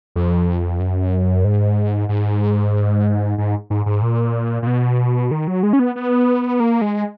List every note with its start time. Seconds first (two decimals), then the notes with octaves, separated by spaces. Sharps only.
0.16 F2
0.80 F#2
1.45 G#2
2.09 G#2
3.38 G#2
3.70 G#2
3.86 G#2
4.02 A#2
4.62 A#2
4.67 B2
5.31 D#3
5.47 F#3
5.63 G#3
5.73 C#4
5.79 B3
5.96 B3
6.60 A#3
6.81 G#3